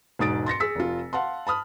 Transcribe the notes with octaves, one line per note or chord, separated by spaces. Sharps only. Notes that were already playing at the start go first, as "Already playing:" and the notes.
E1 G#2 D#6 A6 D7
C6 A6 A#6 C#7
G#4 E6 B6
F1 F4
F5 F#5 A5 C6
A5 B5 D#6 F6